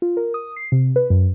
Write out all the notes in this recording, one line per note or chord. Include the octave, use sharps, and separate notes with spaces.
F4
A#4
D#6
C7
C3
B4
F#2